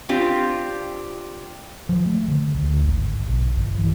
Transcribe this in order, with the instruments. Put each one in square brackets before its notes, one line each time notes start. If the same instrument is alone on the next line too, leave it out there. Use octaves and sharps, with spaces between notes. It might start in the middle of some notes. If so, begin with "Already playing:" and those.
[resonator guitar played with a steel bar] C4 D4 F4 G4
[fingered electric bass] F3
A3
D3
D2
G#1
B1
G1
E3